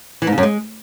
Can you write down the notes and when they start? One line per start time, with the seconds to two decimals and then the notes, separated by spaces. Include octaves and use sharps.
0.22 E3
0.27 G#2
0.32 C#3
0.38 F#2
0.43 G#3